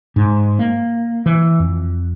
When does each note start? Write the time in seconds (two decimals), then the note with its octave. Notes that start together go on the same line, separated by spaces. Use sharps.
0.16 G#2
0.59 A#3
1.26 E3
1.59 F2